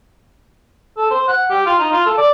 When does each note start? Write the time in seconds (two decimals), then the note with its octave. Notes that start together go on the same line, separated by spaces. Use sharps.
0.98 A4
1.11 C5
1.28 F#5
1.50 G4
1.66 F4
1.79 D#4
1.92 F4
2.06 A4
2.18 D5